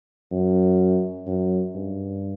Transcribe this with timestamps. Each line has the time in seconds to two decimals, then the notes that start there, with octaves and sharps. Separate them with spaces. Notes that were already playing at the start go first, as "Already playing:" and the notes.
0.32 F#2
1.27 F#2
1.75 G2